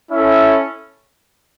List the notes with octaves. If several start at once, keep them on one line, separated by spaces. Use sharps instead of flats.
C#4 E4 A4 E5